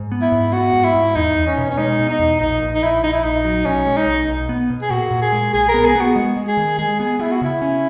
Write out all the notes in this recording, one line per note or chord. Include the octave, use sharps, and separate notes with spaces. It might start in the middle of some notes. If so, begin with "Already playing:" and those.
Already playing: G#2
B3
E4
G#2
B3 F#4
G#2
E4
G#2
E2 D#4
E2
C#4
B2
C#4
G#3 D#4
B2
D#4
E2
A#1 D#4
A#1
D#4
A#1 E4
A#1 D#4
E4
A#1 D#4
F#3
B1 C#4
G#3
D#4
B1
B1
B3
B2
G#4
A#2 F#4
A#2
G#4
G#3
B1 G#4
A#4
B3
G#4
B3 F#4
G#3
G#3
G#4
D#3
G#3 G#4
B3 G#4
B3 E4
F#4
C#3 E4
C#4